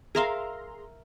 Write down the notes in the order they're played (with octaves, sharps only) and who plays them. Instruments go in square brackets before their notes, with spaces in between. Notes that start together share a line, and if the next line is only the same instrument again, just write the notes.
[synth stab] G#4 A#5 C6 [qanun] A#4 E5 F5